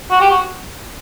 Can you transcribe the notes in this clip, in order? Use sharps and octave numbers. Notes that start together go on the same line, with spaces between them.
F#4
G4
F#4